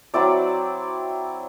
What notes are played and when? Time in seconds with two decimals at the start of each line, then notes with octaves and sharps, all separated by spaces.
0.14 F#3 C4 E4 D5